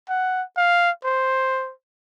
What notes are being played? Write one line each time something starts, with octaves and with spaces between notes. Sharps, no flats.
F#5
F5
C5